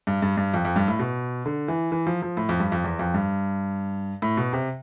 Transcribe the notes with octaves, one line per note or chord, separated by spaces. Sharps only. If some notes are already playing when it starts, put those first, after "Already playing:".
G2
G2
G2
F2
F2
G2
A2
B2
D3
E3
E3
F3
F3
A2
F2
G2
F2
E2
F2
G2
A2
B2
C3